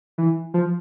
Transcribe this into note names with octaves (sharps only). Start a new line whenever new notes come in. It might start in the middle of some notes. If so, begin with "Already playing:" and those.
E3
F3